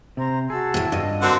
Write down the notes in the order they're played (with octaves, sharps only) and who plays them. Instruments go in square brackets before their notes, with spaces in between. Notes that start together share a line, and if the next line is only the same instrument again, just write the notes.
[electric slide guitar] C3 [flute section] C5 A#5
[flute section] F#4 A5 E6 [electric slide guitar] G#4
[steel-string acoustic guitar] D2 A2
[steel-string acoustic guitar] G2 [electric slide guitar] D4 F4 D#5
[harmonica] D3 C4 F#5 [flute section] F#4 A#4